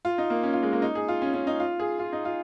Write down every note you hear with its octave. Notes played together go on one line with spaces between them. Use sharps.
F4
D#4
A#3
C#4
F4
G#3
A#3
D#4
G#4
F4
C#4
C#4
D#4
F4
G#4
F4
D#4
F4